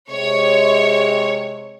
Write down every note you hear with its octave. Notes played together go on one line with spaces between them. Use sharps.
C3 G#3 C#5